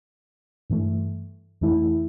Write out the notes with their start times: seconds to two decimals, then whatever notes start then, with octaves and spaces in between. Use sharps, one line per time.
0.70 G2 E3 A3
1.61 F2 E3 A3 E4